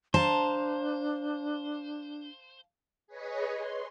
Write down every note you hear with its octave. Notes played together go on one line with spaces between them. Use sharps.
D4 C5 F5 A5 A#5
G#4 B4 C#5 D#5
C6